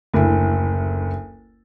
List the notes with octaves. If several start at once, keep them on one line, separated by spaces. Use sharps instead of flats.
F#1 D2 E4